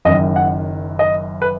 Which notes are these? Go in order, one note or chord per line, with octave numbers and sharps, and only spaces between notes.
F#1 F#2 D#3 D#5
F#5
D#5
B4